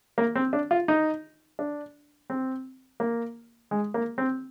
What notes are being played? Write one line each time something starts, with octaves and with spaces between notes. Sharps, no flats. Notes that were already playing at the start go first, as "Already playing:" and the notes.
A#3
C4
D4
F4
D#4
D4
C4
A#3
G#3
A#3
C4